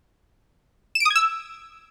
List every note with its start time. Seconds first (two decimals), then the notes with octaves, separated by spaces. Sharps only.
0.95 E7
1.00 D7
1.05 D#6
1.10 G#6
1.16 E6